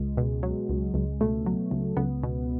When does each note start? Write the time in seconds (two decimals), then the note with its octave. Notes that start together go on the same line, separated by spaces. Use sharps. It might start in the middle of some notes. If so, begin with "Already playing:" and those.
Already playing: C#2 G#3
0.17 B2
0.43 F#3
0.69 C#2
0.94 C#2
1.21 B2 A3
1.46 F#3
1.71 C#2
1.97 C#2 B3
2.23 B2